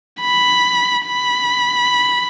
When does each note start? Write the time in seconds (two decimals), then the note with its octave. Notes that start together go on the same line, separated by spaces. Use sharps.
0.21 B5
1.06 B5